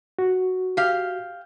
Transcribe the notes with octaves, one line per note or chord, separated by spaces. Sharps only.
F#4
G4 F5